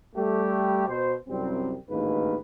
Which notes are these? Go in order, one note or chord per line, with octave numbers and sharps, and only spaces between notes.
G3 A3 G4
B2 C5
C2 F#2 G3 C4
A1 D2 G#2 D#3 A#3 B4